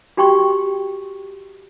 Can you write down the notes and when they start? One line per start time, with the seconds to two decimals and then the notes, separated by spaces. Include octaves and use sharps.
0.17 F#4 G4 G5 C6 C#6